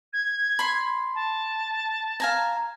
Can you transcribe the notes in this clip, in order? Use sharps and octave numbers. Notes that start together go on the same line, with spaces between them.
G#6
B5 C6
A5
F5 G#5 A#5